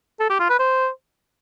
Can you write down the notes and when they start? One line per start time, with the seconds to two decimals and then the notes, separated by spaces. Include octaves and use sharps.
0.20 A4
0.30 G4
0.40 F4
0.50 B4
0.60 C5